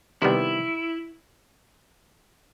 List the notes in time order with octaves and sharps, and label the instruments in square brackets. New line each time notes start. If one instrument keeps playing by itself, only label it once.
[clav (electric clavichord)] C3 D#3 G3 B3 [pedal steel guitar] E4